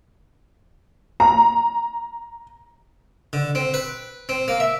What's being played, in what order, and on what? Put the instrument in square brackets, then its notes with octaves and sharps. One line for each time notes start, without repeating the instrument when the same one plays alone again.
[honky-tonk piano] A#5
[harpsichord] D3
C4
B4
C4
A#3
E5